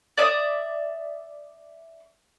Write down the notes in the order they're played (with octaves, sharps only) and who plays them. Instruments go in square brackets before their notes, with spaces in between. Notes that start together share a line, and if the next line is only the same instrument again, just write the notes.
[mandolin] D5 E5 D#6